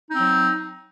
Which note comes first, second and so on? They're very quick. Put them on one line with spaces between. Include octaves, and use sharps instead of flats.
D#4 C4 F#3